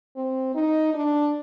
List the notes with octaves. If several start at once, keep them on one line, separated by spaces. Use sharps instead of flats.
C4
D#4
D4